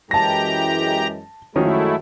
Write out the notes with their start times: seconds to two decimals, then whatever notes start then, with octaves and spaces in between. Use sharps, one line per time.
0.11 F#2 E3 G#3 G4 A5 A#5 A#6
1.56 F#2 D#3 F3 G#3 A3 C#4 E4 F#4